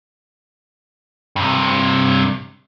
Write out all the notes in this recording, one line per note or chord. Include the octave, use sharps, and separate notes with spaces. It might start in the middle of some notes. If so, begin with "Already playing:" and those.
G2 C3